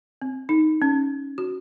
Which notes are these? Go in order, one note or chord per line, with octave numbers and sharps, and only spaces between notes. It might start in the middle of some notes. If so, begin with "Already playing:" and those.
C4
D#4
C#4
F#4